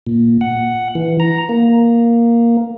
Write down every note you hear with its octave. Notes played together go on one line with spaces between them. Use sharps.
A#2
F#5
E3
A#5
A#3